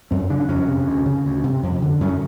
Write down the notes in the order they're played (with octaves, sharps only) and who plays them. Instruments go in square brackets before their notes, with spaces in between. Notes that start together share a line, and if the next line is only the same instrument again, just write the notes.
[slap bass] F#2 C4
C#3 D4
F2 C#4
C3
D2
C#3
D2
C3
F2
D3
F#2 C#4